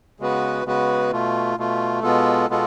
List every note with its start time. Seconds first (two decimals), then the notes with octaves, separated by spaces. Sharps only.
0.20 C#3 G#3 B3 F#4 B4
0.65 C#3 G#3 B3 F#4 B4
1.12 B2 A3 F4
1.57 B2 A3 F4
2.03 B2 G#3 B3 F4 A4
2.49 B2 G#3 B3 F4 A4